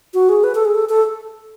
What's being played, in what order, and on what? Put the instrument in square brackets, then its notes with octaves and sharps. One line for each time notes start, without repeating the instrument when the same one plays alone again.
[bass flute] F#4
G#4
B4
A4
G#4
A4
A4